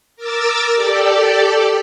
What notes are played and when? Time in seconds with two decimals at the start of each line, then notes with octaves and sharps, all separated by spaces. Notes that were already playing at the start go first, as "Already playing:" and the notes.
0.16 A#4 D6 E6 A6
0.75 G4 A4 D5